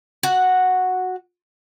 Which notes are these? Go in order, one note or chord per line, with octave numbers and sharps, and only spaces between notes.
F#4 F#5